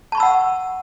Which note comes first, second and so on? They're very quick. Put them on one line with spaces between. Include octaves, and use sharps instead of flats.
A5 C#6 B5 E6 F#5